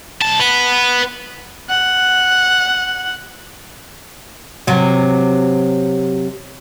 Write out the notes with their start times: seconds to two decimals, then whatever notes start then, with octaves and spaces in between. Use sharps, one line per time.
0.21 C2 A5
0.39 B3
1.69 F#5
4.67 C3 F#3